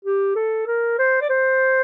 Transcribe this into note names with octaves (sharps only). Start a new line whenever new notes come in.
G4
A4
A#4
C5
D5
C5